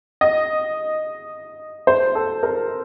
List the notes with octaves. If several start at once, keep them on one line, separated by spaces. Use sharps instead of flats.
D#5
C5
A4
A#4